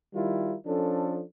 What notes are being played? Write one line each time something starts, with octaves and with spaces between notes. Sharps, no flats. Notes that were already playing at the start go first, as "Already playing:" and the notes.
D#3 G3 E4 F4 A#4
F3 C#4 D4 A4